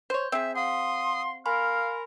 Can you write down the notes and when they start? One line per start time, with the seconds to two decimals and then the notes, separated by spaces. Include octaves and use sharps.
0.10 C5 C#5 G6
0.32 C4 G#4 E5
0.56 F5 F#5 C6 D#6
1.46 A#4 F5 G#5 B5 C6